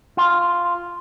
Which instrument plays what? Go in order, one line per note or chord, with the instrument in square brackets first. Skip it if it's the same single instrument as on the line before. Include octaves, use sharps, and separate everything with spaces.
[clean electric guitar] F4